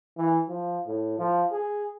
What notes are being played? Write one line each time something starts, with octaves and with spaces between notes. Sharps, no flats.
E3
F3
A2
F3
G#4